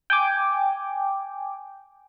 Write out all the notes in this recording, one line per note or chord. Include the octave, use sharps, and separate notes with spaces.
G5 G#5 D6